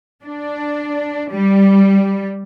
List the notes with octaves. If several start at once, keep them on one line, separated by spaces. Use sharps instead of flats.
D4
G3